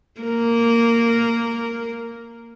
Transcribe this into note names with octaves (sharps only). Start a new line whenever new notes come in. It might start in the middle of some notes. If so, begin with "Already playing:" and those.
A#3 A#4